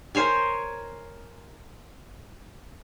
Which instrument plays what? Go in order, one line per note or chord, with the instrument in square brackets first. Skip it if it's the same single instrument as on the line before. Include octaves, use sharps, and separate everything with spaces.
[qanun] A#4 C5 C#5 G#5